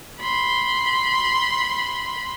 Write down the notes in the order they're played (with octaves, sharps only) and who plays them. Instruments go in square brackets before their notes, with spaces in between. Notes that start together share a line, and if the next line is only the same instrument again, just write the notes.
[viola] B5 C6